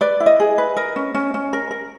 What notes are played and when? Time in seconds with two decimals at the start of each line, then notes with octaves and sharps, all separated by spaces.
0.01 B4 D5
0.20 E4
0.26 D#5
0.40 G#4
0.58 B4
0.77 A#4 D#5
0.96 C#4
1.14 C#4
1.34 C#4
1.53 A#4
1.71 A#4